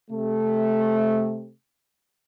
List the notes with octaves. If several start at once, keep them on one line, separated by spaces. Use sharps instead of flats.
C3 A3